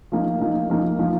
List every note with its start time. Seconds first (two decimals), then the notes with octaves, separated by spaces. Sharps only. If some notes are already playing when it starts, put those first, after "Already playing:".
0.12 F3 A#3 D#4
0.40 F3 A#3 D#4
0.70 F3 A#3 D#4
0.99 F3 A#3 D#4